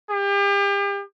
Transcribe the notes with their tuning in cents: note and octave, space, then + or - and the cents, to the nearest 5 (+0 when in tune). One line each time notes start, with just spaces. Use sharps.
G4 +35